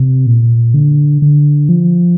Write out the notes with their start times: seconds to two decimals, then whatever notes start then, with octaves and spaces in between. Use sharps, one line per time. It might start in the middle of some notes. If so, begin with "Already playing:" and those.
Already playing: C3
0.26 A#2
0.74 D3
1.22 D3
1.69 F3